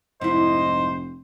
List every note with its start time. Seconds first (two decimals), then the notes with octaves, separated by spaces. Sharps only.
0.21 F1 G#2 E4 C5 D#5